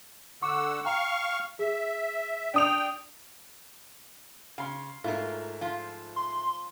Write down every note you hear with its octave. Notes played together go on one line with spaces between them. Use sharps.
D3 F#5 C#6 D6 E6
F5 G5 A#5 C#6 F6
G#4 E5
D4 G5 D#6 F7
C#3 F5 C6
G#2 A3 E4 F4 A#4
F3 F4
C6